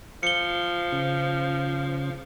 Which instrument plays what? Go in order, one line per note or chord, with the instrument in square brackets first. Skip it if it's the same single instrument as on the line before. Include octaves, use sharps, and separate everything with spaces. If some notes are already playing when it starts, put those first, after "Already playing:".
[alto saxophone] F3 [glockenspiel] C#7 G7
[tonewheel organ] C#3